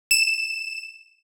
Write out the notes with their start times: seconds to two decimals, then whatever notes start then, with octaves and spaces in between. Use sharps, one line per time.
0.11 E7